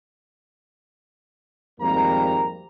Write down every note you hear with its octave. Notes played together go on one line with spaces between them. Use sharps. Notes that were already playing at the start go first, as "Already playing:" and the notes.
G#1 F2 G3 A#3 C4 A#5